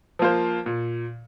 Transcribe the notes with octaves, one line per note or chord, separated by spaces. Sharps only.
F3 A#3 F4 C5
A#2